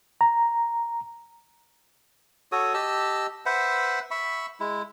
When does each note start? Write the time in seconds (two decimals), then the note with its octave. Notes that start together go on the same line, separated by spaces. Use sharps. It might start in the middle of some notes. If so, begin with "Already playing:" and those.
0.21 A#5
2.52 F#4 A4 C#5 D#6
2.74 G4 D#5 A5 E6
3.46 B4 C5 E5 F#5
4.11 E5 B5 C#6
4.60 G#3 E4